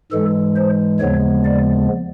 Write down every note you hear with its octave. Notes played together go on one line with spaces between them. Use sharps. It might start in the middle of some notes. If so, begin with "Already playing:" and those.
G#2 E3 G#3 A4
C5
D#2 C#3 F3 G#3 B3 C#5
D5